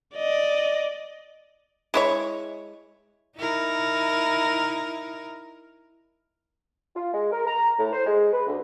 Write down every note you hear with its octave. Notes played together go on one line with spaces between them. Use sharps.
D5 D#5
G#3 E4 C#5
D#4 E4 A#4
F4
G#3
A#4
A#5
A2
C5
G#3
B4
D2